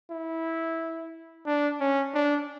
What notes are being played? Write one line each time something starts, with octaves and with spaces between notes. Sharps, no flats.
E4
D4
C#4
D4